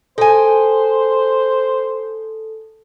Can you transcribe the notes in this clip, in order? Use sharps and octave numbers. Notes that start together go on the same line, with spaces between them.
A4 C5 G5 G#5